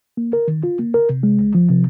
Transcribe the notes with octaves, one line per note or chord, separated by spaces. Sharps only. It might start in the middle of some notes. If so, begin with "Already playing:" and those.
A#3
A#4
D#3
F4
A#3
A#4
C3
G#3
C#2
F3
C3